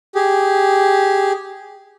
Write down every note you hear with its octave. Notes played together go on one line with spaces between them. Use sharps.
G4 G#4